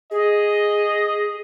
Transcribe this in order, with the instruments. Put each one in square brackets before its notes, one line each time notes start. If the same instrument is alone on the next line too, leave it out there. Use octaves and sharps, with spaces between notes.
[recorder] G#4 [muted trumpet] D#5